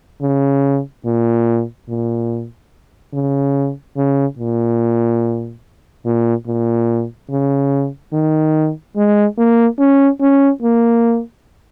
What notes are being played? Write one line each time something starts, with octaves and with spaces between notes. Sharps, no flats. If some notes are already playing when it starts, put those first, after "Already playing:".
C#3
A#2
A#2
C#3
C#3
A#2
A#2
A#2
C#3
D#3
G#3
A#3
C#4
C#4
A#3